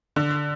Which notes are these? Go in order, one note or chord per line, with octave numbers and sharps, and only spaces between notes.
D3